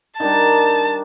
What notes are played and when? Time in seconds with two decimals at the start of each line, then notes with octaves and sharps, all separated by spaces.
0.20 D#3 G3 D4 A5